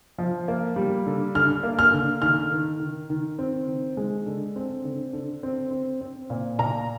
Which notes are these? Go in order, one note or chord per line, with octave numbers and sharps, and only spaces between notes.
F3
A#3
G3
D3
D3 F6
A#3
F6
D3
D#3 F6
D#3
D#3
D#3
C4
D#3
G#3
D3
C4
D3
D3
C4
C4
C4
A#2
A#2 A#5